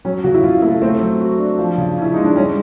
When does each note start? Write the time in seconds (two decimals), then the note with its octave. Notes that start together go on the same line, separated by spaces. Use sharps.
0.05 F#3 C#4
0.24 C#3 F#4
0.34 E4
0.43 C#3 F4
0.62 A3 E4
0.82 A3 C4
1.01 F#3
1.21 F#4
1.39 D4
1.59 F3
1.78 C#3
1.97 C#4 E4
2.14 G#3 D#4
2.24 D4
2.36 G3 C#4